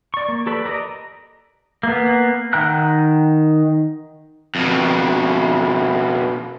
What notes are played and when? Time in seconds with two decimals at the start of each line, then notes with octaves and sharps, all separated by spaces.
0.14 D5 C#6
0.28 A#3
0.46 G4 A4 B4 D5 B5
0.65 A#4 D5 D#5 A#5
1.83 A#3 B3
2.53 D#3 F#5 G5 A#5 F#6
4.55 F2 B2